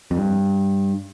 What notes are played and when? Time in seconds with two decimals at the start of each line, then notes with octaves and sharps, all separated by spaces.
0.11 F2
0.17 G2